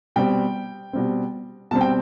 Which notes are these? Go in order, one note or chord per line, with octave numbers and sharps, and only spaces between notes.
B2 G3 C4 G5
B2 G3 C4
B2 G3 C4 A5
G5